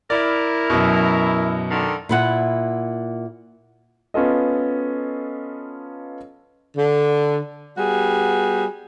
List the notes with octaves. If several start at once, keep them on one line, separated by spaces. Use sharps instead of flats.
E4 A#4 D5
F#2 B2
D3 D#3
A#2 E4 F#5
B3 C#4 F4 A4 D#5
D3
G3 B3 F#4 G#4